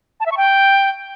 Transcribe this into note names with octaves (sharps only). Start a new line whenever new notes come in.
A5
E5
C#6
G5